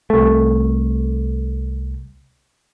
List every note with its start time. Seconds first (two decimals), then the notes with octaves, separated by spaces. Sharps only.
0.10 C2 A3